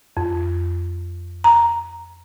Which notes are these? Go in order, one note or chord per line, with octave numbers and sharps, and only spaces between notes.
F2
A#5